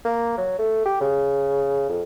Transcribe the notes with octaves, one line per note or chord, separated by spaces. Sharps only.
A#3
F#3
A3
G4
C#3
F2